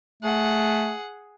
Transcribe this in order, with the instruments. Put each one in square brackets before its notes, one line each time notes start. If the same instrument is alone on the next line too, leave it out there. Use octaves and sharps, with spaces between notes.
[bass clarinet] A3 [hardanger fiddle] G#4 F#5